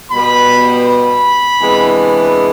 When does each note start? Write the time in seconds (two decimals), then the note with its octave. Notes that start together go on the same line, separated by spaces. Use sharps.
0.11 B2 G3 B3 B5
0.86 B5
1.60 C3 E3 G#3 B3 D4